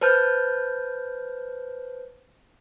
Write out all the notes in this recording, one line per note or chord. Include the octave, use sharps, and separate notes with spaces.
B4 C5 A5 F6 G6